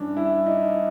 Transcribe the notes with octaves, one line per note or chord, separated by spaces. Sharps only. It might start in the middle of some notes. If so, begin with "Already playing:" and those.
Already playing: G2 E3 C#4 D4
E4
D#4